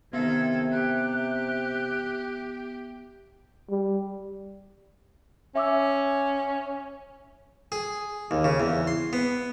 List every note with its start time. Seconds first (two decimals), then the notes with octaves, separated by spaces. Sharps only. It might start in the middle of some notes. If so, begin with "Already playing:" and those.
0.13 C3 D#3 B3 A4 E5 G#6
0.71 G4 F#6
3.70 G3
5.55 C#4 E5 D6 E6
7.72 G#4
8.31 D#2
8.44 C#3
8.60 E2
8.87 C6
9.13 B3